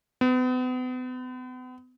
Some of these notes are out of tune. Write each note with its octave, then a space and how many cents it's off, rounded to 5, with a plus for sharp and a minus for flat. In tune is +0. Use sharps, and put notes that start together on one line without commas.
B3 +40